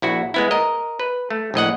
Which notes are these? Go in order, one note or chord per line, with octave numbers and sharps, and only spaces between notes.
A#1 E4 F#4
G#3 B3 E4
A#4 D#5
B4
A3
A#1 A2 D#5 F#5